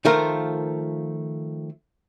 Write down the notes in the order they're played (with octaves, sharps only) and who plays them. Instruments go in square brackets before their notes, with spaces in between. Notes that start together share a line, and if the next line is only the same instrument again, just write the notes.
[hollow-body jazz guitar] D#3 F3 A3 F4 A#4